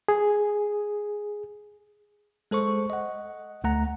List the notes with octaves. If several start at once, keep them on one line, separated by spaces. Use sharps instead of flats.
G#4
G#3 A4 C5 C#6
D#5 F#5
D2 A3 F#5 A#5